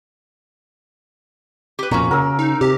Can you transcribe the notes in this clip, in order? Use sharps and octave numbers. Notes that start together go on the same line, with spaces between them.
G4 B4
F2 A#2 C#4 F#4 A#5
C#3 A#4 E6
D#4
C3 G4